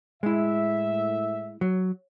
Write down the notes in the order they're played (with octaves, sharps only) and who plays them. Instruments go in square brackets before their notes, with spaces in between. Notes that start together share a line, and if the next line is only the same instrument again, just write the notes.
[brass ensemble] A2 E5 [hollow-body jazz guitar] G#3 E4
[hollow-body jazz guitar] F#3